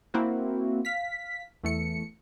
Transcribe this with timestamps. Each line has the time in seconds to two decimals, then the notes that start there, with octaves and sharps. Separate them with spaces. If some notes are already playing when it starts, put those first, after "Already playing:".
0.14 A#3 C4 E4 F#4
0.85 F5 B6
1.64 E2 A3 C#7